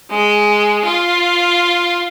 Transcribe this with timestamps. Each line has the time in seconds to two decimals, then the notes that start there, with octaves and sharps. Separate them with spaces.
0.11 G#3
0.85 F4